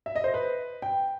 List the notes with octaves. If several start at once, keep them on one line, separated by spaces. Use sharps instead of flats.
E5
D#5
C5
B4
G5